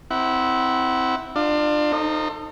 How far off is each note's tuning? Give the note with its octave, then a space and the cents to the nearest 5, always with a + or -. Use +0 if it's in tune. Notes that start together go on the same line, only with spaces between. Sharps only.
C4 +0 E4 -10 F#5 +20
D4 +30 F4 +0
D#4 -15 A4 +30 C5 +15